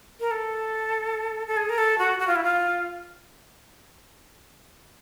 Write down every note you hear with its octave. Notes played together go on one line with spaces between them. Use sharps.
A#4
A4
A4
G#4
A#4
A4
F#4
F#4
F4
E4
F4